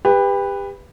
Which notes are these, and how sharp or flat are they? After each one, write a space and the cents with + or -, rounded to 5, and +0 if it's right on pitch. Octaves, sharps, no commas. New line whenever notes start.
G4 +30 B4 +0